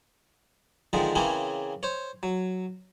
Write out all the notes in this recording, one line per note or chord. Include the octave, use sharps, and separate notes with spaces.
D3 D#3 F3 G#3 C4
C#3 E3 A#3 C4 C#4 G#4
C5 C#5
F#3